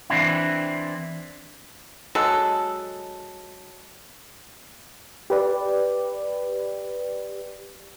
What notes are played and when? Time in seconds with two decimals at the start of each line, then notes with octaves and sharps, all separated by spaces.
0.10 E3 C4 D4 E4
2.15 F#3 G#3 A4
5.30 G4 B4 D5